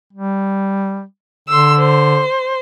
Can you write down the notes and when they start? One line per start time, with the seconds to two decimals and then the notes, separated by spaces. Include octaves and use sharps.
0.13 G3
1.48 D3 C6 E6
1.78 C5